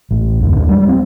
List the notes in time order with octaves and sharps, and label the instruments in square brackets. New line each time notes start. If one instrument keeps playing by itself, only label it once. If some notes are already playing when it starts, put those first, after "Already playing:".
[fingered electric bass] A1
F1 D2 G2
D#2 D4
F#3 G3
C4